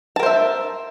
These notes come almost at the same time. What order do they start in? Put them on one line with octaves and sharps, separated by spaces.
A5 A#4 C5 E5